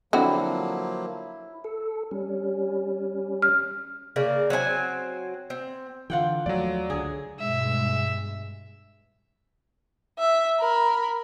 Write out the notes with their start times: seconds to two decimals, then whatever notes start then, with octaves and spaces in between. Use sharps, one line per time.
0.13 D3 F3 F#3 A#3 C4 E4 F#4
1.64 A4
2.11 G3 C#4
3.42 F6
4.16 C#3 A#3 D5
4.50 F#3 C4 D#4 G#5
5.50 C4
6.10 D3 E3 F4 F#5 G5
6.46 D#2 F3 F#3 A3 D5
6.90 C#2 D3 G#4
7.40 G2 B2 G#3 E5
10.19 E5
10.60 A#4 B5